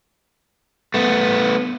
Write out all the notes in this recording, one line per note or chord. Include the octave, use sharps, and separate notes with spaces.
A3 B3